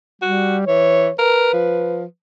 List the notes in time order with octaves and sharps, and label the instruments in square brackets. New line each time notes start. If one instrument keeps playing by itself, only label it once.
[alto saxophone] G3 [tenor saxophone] F#4
[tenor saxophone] E3 [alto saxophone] C#5
[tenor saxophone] A#4 [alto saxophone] B4
[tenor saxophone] F3